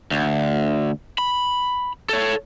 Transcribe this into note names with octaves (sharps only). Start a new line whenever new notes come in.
D2
B5
A4 C#5